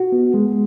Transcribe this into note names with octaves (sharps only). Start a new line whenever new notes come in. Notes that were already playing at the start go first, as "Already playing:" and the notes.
Already playing: F#4
B3
G#3